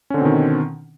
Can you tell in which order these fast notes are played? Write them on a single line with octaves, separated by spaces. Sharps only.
C#4 D3 C4 B2 D#3